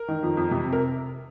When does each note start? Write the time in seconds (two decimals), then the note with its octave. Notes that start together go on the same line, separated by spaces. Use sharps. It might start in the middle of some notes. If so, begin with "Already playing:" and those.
Already playing: A#4
0.08 D#3
0.23 F2
0.37 F2
0.51 C3
0.73 A#4